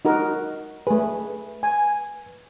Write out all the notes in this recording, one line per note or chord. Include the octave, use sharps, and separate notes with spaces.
D#4 F#4 A#4
A3 G#4 B4
G#5